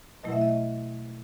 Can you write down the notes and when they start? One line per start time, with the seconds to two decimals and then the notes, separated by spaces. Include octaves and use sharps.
0.23 B2 F#3 A3 E4 D#5
0.32 E5
0.41 D#5